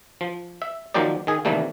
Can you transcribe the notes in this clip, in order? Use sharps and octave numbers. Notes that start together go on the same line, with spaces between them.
F3
E5
D#3 F3 F#3 A#3 G4 D5
D#3 G#4
C3 D#3 E3 G3 A3 A#3